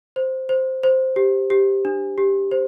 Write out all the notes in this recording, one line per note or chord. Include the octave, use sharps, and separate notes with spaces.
C5
C5
C5
G4
G4
D4
G4
C5